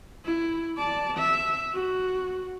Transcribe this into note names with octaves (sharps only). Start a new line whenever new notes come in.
E4
D5 A5
E5
F#4